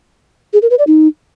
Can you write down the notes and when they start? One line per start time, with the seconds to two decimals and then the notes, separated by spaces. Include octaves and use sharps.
0.53 G#4
0.62 A#4
0.70 B4
0.79 D5
0.87 D#4